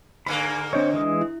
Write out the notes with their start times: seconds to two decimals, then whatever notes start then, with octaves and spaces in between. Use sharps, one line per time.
0.26 G#2 D3 A#3 G#5 B5
0.73 C4 D4 C5 C#5 D#5
0.94 E3 G#3 D#6
1.21 E4